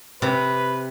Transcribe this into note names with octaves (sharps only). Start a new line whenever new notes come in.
C3 B4